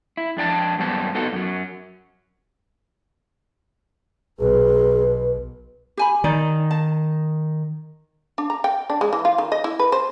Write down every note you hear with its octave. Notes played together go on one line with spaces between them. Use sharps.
E4
F2 D4 G5 A5
F#2 G3 B3 C5 A5
B3 D#4 F#4 A4
F#2 F#3
B1 G#4 B4
G4 G#5 B5
D#3 D#4 D5
A5
D4
A#5
G5
D4
G#3
E3
F4
D#3
D#5
E4
B4
C5